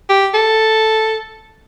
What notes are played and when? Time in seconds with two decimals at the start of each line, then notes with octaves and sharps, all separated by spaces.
0.09 G4
0.34 A4